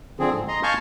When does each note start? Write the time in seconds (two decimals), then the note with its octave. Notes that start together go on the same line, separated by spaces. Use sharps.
0.20 D3 F3 C4 G#4
0.33 G#2
0.48 D#5 A#5 C6
0.63 F5 G#5 A5 C#6 F6 G6